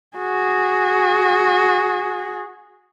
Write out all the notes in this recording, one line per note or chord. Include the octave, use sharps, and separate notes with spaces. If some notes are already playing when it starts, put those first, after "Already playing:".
F#4 G#4